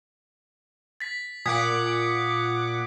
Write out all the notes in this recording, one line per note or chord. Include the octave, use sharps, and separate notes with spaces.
A6 B6
A#2 F#5 D6 D#6 G#6 B6